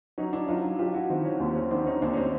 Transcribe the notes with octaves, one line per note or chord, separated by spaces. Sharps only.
F#3 C#4 D#4
D4 E4
F#3 D#4 F4
F#3 F4 G4
E4 F#4
D#3 C4
C#4
D#2 C4
C4
C#4
D#3 C4 D4
C#4 D#4
D#2 C4 D4
C#4
C4 D4